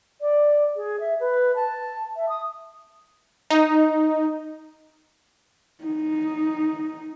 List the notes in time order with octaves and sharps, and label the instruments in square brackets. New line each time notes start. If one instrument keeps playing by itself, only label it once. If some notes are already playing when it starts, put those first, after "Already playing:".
[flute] D5
G#4
E5
B4
A5
E5
D#6
[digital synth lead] D#4
[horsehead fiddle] D#4